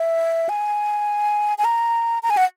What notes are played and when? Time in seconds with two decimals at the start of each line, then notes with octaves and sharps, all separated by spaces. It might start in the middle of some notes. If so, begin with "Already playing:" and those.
Already playing: E5
0.49 G#5
1.58 G#5
1.65 A#5
2.23 A#5
2.30 G#5
2.37 F#5